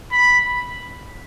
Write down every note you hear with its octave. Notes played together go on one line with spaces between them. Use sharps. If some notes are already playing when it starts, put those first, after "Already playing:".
B5